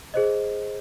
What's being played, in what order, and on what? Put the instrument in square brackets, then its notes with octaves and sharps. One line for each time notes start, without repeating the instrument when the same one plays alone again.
[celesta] G#4 C5 D#5